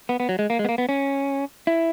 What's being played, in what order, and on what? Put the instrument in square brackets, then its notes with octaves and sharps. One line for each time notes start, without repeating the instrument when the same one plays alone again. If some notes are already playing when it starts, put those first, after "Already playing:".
[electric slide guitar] B3
B3
F#3
G#3
A#3
G#3
B3
A#3
B3
C#4
E4